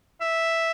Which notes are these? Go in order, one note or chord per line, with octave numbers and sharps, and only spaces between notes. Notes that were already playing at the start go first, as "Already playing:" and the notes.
E5